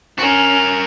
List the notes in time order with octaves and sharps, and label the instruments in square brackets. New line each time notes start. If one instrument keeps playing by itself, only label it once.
[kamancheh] C#4 [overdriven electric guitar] F#4 A#4